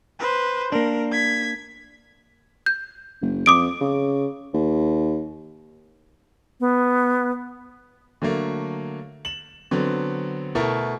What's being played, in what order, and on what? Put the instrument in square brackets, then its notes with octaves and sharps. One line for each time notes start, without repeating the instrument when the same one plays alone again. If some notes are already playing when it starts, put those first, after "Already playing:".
[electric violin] B4 C5
[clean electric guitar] A#3 D4 [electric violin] A#4
[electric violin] G#6 B6
[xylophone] G6
[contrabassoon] F#1
[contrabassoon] F2 [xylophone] D6 D#6 D7
[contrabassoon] C#3
D#2
[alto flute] B3
[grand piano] D3 F#3 A3 A#3
E7 F#7
D3 F#3 B3 C4
B2 A3 E4 A4 A#4